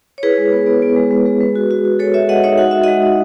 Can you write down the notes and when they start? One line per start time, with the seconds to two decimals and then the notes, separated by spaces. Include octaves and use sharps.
0.18 C#5
0.23 E4 G#4 B4
0.38 G#3
0.52 B3
0.67 B3
0.82 B3
0.96 G#3
1.11 G#3
1.26 G#3
1.40 G#3
1.55 F#4
1.71 F#4
1.85 F#4
1.99 G#3 A4 C#5
2.14 F#4 C#5 E5
2.29 G#3 D#5 F#5
2.43 D#4 C#5 E5
2.58 F#4 F#5
2.71 F#4 E5
2.83 G#3 D#5 F#5
3.02 D#4